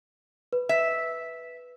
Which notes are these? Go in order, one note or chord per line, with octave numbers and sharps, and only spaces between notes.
B4
E5